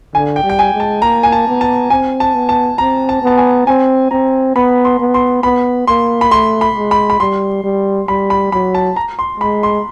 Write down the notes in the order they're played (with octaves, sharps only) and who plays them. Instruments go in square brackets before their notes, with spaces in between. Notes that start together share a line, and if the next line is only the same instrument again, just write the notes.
[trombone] D3 [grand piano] G#5
[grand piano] G5
[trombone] G3
[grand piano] G5
G#5
[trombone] G#3
[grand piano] A5
[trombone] A#3 [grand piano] A#5
[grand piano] G#5
A5
[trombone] B3
[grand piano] A5
[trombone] C4 [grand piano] G#5
[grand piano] A5
[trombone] B3
[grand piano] A5
[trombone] C4 [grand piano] A#5
[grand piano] A5
[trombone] B3 [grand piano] A5
[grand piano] G#5
[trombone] C4 [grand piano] G#5
[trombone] C4 [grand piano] A#5
[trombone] B3 [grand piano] B5
[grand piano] C6
[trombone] B3
[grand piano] C6
[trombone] B3 [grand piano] B5
[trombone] A#3 [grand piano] C6
[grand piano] B5
[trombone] A3 [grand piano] C6
[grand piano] B5
[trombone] G#3
[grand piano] B5
B5
[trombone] G3 [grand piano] C6
[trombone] G3
[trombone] G3 [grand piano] B5
[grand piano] B5
[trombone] F#3 [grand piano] B5
[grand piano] A5
A#5
C6
[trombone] G#3 [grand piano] B5
[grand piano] C6